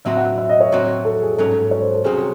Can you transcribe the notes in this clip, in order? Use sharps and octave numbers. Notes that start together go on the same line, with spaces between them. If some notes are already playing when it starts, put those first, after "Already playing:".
A2 F#3 C4 F#4 E5
F#5
E5
D#5
C#5
A2 F#3 C4 F#4
A4
G#4
G#2 F#3 C#4 A4
C#5
C5
A4
C2 C3 F#3 C#4 F#4 G#4